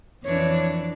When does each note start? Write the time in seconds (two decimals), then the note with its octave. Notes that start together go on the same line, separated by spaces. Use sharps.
0.24 F2 E3 D4 C#5